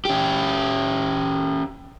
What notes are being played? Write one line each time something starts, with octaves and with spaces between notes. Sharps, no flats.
C#4 G4